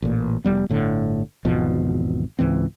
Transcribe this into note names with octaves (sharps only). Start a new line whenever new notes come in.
A1 A#2
F1 G#2 G3 B3
G1 A2 D3
G#1 E2 B2 F3
C#2 G#2 E3 C4